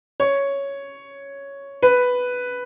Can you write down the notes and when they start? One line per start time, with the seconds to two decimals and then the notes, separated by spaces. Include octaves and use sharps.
0.20 C#5
1.82 B4